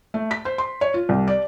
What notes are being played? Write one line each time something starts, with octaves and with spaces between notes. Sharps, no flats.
A3
B6
C5
C6
C#5
F4
C2
D5